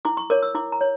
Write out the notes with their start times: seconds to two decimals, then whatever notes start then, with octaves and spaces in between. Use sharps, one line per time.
0.05 E4 D6
0.17 C#6
0.30 A#4 C#5 D6
0.42 E6
0.55 E4 D6
0.72 A#5
0.81 C#5